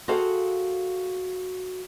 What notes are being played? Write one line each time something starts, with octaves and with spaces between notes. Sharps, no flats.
F#4 G#4 A4 C5 F5 G5